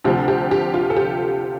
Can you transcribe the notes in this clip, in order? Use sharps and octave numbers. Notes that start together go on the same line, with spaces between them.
D2 C3 F3 G4
G4
G4
F4
A4
G4